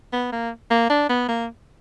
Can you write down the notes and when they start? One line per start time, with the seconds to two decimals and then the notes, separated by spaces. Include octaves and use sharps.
0.13 B3
0.32 A#3
0.71 A#3
0.90 D4
1.09 B3
1.29 A#3